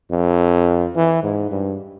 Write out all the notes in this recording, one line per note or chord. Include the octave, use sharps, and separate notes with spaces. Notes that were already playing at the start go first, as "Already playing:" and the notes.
F2
E3
G#2
G2